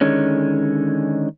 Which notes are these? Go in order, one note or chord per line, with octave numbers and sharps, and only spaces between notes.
D3 D#3 G#3 C#4